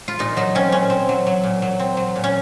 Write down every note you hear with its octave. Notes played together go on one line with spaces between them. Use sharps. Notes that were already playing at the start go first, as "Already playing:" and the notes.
F4
A#2 D#4
F#3 D#4
C4 C#4
A#2 C#4
C4
F#3
F#3
A#2
F#3
C4
F#3
A#2
C#4